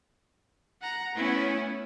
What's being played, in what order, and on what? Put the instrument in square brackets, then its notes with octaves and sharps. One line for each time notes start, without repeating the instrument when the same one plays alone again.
[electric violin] F#5 A#5
[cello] A3 C#4 [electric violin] B3 E4